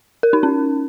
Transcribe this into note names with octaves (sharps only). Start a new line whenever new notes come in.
A#4
D#4
C#4